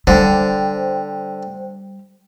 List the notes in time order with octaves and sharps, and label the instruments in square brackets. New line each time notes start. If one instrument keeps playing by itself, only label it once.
[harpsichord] D3 [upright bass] G3 [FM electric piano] C5 G5